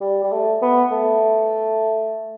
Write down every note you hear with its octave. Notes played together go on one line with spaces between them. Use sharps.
G3
G3
A3
B3
A3